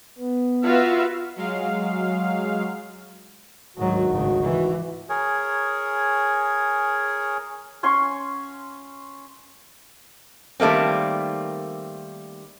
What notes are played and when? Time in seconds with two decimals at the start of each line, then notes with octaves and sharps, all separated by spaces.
0.18 B3
0.63 F4 F#4 B4 E5 F5
1.36 F#3 G#3 F5
3.77 D2 G#2 D#3 F#3 F#4
4.10 G#1 C#3
4.43 E3
5.09 G#4 A#4 C#5 G#5
7.83 C#4 C#5 G#5 C6
10.60 D#3 G3 A3 A#3 C4